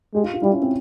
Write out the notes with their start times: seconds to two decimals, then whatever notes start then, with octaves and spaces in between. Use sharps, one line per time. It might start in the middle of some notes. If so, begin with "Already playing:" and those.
0.15 G#3 G4
0.24 F4
0.34 F4
0.42 G3 E4
0.52 C#4
0.62 C4